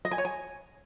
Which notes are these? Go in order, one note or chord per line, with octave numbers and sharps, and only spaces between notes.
D#5
G#5
C#5
G#5